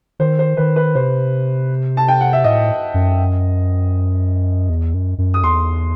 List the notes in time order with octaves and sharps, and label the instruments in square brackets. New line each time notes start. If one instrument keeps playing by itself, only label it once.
[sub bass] D#3 [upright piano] C5
[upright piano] C5
[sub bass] D#3 [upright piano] B4
[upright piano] B4
[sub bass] C3 [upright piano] C5
[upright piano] A5
G5
F#5
E5
[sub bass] A2 [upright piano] D#5
[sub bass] F#2
E2
F#2
F#2
[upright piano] D#6
[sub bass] E2 [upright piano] C6